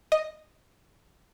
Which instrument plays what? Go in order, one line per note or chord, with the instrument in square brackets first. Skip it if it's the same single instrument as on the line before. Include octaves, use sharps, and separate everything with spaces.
[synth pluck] D#5